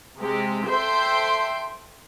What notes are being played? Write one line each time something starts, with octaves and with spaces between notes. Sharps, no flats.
C3 G#3 C4 G4
A4 C5 E5 G5 C6 G6